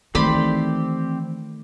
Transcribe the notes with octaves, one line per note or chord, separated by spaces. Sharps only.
D#3 E3 A3 C4 G4 D5 B5 C6